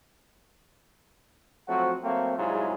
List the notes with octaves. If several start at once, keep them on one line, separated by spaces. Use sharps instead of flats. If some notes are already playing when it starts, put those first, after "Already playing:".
F3 F#3 A3 C4 F#4
F#3 A3 A#3 C4
C2 G#2 F#3 G#3 E4 F4